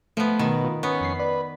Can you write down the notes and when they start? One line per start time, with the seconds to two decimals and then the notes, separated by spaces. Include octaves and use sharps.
0.17 F3 A3 B3
0.39 B2 D#3
0.64 F4
0.83 B3 C#4
1.01 F2 B6 C7
1.20 B4 D5